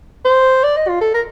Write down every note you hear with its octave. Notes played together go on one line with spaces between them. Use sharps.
C5
D5
D#5
F4
A4
A#4